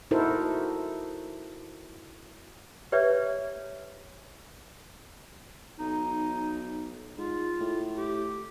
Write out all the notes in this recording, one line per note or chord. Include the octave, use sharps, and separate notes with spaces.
D#4 E4 F#4 A4 A#4 C5
G4 B4 C#5 D5 E5
B1 D#4
G#2 F4
A2
G4